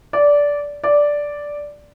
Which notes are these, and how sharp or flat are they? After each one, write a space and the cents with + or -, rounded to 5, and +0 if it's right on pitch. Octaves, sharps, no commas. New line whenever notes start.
D5 -15
D5 -5